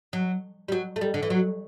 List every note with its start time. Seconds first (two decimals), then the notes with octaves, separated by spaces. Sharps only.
0.13 F#3
0.68 G3
0.72 F#3
0.96 A3
1.01 G3
1.14 D3
1.23 E3
1.30 F#3